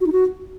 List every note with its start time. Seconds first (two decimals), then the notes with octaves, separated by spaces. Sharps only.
0.01 F#4
0.07 D#4
0.12 F#4